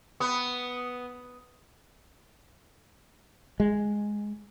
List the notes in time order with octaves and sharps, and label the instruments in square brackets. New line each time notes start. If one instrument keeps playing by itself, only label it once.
[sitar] B3 [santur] D#6
[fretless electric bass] G#3